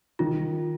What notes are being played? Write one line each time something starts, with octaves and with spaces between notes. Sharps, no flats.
D#3 F4